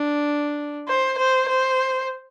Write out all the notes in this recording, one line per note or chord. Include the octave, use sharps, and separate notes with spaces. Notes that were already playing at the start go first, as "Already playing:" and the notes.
Already playing: D4
C5
C5
C5